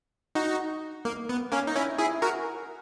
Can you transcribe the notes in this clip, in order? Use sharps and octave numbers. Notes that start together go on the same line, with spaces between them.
D#4 F#4
A#3
B3
A#3 C#4
D#4
C#4 E4
E4 G#4
F#4 A#4